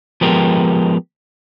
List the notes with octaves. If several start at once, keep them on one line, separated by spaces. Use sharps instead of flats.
F3 G#3 B3 G4 A#4